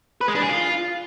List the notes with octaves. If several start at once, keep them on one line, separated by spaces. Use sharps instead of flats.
B4
G#3
D4
G#4
F4